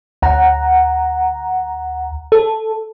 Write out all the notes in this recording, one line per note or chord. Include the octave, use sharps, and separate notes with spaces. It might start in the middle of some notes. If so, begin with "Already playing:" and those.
D2 F#5 A#5
A4